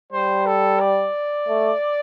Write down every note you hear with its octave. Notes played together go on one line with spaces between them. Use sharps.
G3 C5
A4
D5
A3